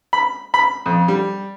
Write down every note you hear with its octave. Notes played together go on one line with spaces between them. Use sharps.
B5
B5
F2
G3